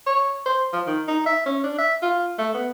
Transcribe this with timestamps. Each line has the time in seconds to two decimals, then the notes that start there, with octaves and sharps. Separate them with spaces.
0.06 C#5
0.46 C5
0.73 F3
0.87 D#3
1.08 D#4
1.26 E5
1.46 C#4
1.64 D4
1.78 E5
2.02 F4
2.38 A3
2.54 B3